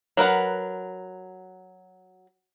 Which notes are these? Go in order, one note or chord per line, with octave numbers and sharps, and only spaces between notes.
F#3 A#4 B4 F#5